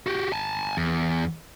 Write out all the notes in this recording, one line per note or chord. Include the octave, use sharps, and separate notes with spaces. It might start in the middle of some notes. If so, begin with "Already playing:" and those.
F#4 G4
G#5 A5
E2